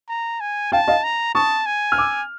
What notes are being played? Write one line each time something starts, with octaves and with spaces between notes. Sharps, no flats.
A#5
G#5
F5 G5 A5
D#5 F5
A#5
A5 C#6 D#6
G#5
F6
D6 E6